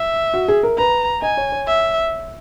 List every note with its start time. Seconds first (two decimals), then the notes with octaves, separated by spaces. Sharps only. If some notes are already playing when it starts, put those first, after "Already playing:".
Already playing: E5
0.34 F#4
0.48 G#4
0.63 A#4
0.78 B4 A#5
1.22 D#5 G#5
1.37 C#5
1.52 C#5
1.67 E5